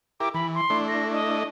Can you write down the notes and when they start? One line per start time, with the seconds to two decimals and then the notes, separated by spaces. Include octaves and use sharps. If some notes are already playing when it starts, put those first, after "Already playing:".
0.20 E4 G4 A#4 D6
0.34 E3 B5
0.55 C6
0.70 A3 D4 E4
0.88 A#6
1.13 D#5